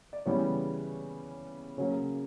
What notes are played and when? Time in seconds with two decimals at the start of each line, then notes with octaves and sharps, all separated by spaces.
0.13 D5
0.26 C#3 E3 G3 B3 C#4 C#5
1.78 C#3 F#3 A#3 C#4 C#5